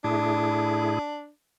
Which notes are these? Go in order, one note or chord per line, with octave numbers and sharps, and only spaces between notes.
A2 D4 E4 G#4